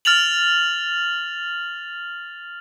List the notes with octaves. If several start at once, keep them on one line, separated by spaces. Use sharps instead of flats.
F6 A6 F7 F#7